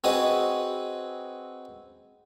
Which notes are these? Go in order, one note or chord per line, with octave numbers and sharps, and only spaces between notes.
C4 F#4 G#4 B4 D#5